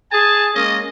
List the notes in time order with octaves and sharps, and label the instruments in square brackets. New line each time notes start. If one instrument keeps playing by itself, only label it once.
[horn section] G#4 G#5 [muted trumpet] A5
[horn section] G#3 A#3 C#4 [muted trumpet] D#5